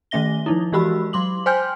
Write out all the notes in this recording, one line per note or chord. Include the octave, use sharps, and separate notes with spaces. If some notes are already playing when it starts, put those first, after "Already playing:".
D#3 A3 C#4 E5 A#6 G7
F3 D#4 E4
E3 G#3 F#4 G4 B5 E6
F#3 C6 D6 F#7
C5 G5 G#5 C6 F6 G6